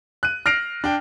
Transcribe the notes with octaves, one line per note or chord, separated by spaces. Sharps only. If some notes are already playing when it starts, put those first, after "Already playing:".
F#6 D#7
F6 A#6 C7 D7 F7
D4 G5